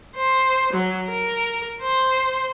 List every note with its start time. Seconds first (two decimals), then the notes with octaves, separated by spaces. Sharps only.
0.16 C5
0.73 F#3
1.09 A#4
1.83 C5